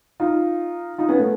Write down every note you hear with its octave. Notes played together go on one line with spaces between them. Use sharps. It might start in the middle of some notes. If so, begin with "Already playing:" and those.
D#4 F4
D#4 F4
B3 C#4
A3 B3